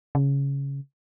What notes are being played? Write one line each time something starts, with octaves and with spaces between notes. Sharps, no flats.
C#3